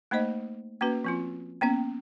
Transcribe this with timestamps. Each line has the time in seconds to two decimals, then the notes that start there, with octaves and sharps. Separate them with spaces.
0.11 A3 A#3 D#4 C5 D#5
0.81 A#3 C#4 F#4 B4
1.04 F3 C4 F4
1.61 A#3 B3 C#4 G5